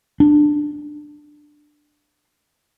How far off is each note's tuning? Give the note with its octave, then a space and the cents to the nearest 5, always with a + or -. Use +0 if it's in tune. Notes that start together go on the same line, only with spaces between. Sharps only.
D4 +10